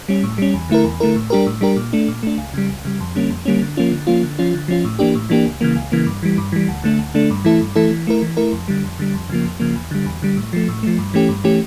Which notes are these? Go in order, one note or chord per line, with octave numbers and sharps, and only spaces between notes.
G3 C#4
A2
G3 C#4
E2
D3 A3 E4 A#4
E2
D3 A3 E4 A#4
A2
G3 D4 G4 A#4
A2
G3 D4 G4 A#4
A#2
A3 D4
A#2
A3 D4
C#2
C#3 G3
C#2
C#3 G3
F2
D3 G3 A#3 C#4
F2
D3 G3 A#3 C#4
D3
F3 A#3 C#4 F4
D3
F3 A#3 C#4 F4
D3
F3 C#4 F4
D3
F3 C#4 F4
A2
E3 A#3 D4 G4
A2
E3 A#3 D4 G4
C#2
C#3 E3 A#3
C#2
C#3 E3 A#3
G2
E3 G3
G2
E3 G3
D2
D3 A3 D4
D2
D3 A3 D4
G2
E3 A3 E4 A4
G2
E3 A3 E4 A4
E3
A3 E4 A#4
E3
A3 E4 A#4
F2
D3 G3
F2
D3 G3
F2
C#3 F3 A#3
F2
C#3 F3 A#3
E2
D3 G3
E2
D3 G3
A2
F3 A3
A2
F3 A3
G2
E3 A3 C#4 G4
G2
E3 A3 C#4 G4